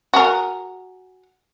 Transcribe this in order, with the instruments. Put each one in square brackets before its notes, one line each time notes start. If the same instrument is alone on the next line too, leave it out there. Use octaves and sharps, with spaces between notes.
[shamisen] F#4 G#4 A#4